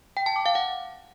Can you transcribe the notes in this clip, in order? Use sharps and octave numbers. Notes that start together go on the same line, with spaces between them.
G5
A5
D6
F5
F#5